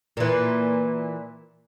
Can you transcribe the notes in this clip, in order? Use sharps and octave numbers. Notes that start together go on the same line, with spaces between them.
A#2 E3